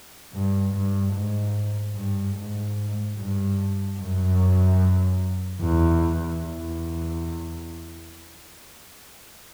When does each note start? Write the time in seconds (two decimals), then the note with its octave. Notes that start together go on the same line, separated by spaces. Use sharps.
0.33 G2
0.74 G2
1.14 G#2
1.96 G2
2.37 G#2
3.18 G2
4.00 F#2
5.63 E2
6.44 E2